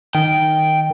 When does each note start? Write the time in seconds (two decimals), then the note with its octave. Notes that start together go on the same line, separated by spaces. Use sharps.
0.15 D#3 G5